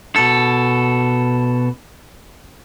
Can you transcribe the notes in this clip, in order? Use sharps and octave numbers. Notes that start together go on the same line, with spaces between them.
B2 A4